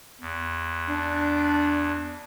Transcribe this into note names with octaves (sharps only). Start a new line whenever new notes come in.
E2
D4